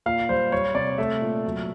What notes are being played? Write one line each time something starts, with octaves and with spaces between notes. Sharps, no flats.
A#2 F5
G3 C5
G3 C#5
C3 D5
A3 E5
A#2
F#3